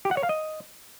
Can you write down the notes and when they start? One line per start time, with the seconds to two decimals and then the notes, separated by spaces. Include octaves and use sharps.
0.05 G4
0.11 F#5
0.17 C#5
0.23 F5
0.29 D#5